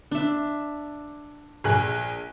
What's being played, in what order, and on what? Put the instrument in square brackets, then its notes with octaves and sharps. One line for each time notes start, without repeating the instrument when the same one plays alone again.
[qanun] D4 E5
[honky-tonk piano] A#1 G#4 F#6